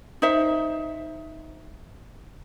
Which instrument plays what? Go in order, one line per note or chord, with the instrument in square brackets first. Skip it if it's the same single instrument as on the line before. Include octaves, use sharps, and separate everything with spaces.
[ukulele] D#4 C5 E5